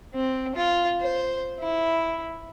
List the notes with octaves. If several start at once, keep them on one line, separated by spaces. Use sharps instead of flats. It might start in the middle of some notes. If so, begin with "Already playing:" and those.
C4
F4
C5
E4